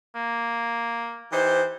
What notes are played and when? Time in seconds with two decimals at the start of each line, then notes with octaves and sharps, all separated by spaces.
0.15 A#3
1.33 E3 D#4 G4 C5